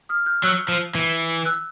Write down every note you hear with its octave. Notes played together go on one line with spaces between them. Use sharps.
D#6 F6
F6 G6
F#3 E6 F#6
F3
E3
E6 F#6